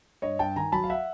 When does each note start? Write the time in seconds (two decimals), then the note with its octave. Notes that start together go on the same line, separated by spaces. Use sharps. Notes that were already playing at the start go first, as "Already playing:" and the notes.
0.22 G2 C#5 D#5
0.39 G2 G5 A5
0.56 D#3 G#5 A#5
0.72 F#3 A5 B5
0.84 F5
0.90 E5 F#5